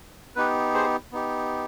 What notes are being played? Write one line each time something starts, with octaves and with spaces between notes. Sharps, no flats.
B3 D#4 G4 B4
G#4 C5
B3 D#4 G4